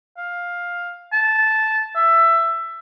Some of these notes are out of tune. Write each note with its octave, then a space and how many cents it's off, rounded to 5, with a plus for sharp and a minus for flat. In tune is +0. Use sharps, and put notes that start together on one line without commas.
F5 +10
A5 -10
E5 +15